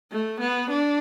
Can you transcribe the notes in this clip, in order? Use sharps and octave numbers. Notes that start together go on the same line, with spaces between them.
A3
B3
D4